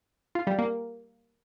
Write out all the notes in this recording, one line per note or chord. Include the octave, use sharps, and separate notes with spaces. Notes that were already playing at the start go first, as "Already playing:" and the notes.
F4
G3
A#3